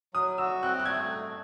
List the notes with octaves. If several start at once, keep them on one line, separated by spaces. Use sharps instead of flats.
F#3 D#6
F#4 E6
C4 F#6
F#6
A3 G#6